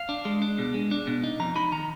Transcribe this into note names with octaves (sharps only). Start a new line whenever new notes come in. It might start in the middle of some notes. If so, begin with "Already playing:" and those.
Already playing: F5
D4
G#3
D4
B2
G#3
D4
B2
D#4
F2 A#5
D#4 B5
D#3 A#5